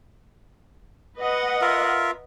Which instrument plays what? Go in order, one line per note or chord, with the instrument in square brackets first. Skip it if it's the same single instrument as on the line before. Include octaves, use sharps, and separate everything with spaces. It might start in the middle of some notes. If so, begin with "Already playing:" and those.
[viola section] B4 D#5 F#5
[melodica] F4 A#4 E5